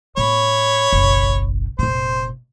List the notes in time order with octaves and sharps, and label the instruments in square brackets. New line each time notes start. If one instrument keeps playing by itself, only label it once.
[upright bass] A2 B3 [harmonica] C#5 B5
[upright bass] F#1 B1
[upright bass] F1 A#2 [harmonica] C5